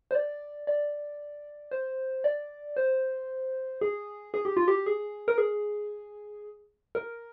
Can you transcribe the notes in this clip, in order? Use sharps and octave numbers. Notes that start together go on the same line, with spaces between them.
C5
D5
D5
C5
D5
C5
G#4
G#4
G4
F4
G4
G#4
A#4
G#4
A#4